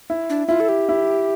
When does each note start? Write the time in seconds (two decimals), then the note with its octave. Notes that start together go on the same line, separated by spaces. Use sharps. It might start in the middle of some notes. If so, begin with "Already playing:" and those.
0.10 E4
0.30 D4
0.48 E4 F4
0.60 A4
0.69 G4
0.89 E4